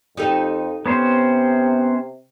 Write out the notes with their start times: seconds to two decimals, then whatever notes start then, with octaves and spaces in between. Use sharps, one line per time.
0.17 F2 D#4 G4 A4
0.86 C3 B3 C#4 C5